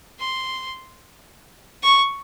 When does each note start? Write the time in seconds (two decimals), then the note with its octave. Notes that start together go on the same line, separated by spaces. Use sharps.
0.20 C6
1.83 C#6